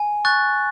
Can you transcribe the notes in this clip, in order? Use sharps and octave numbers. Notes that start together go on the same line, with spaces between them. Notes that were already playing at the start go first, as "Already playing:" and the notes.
Already playing: G#5
C#6 F#6 A6